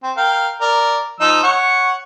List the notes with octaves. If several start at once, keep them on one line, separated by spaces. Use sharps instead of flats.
C4
A#4 F5 G5
A#4 D5
F3 D#4 E6
C#5 F#5 C#6